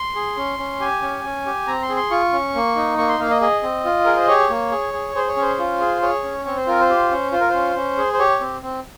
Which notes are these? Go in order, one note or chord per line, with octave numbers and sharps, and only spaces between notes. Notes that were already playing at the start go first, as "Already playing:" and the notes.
Already playing: C6
G#4
C#4
C#4
G4 G#5
C#4
C#4
G4
C4 A#5
C6
G#4
C6
F4 C#6
C#4
A#3
D#4
A#3 C#6
C6
A#3 F5
D#5
G#4 D#5
C4
F4
G#4 A#4
C5
G4 C#5
A#3
G#4
G#4
G#4 C5
C#5
C#4 C5
F4
G#4
G#4 C#5
C#4
C4 C#5
C5
F4 A#4
C5
G4
C#4
F4 C5
A#4
C#4 C5
C#4
G#4
C5
G4 C#5
C4
C4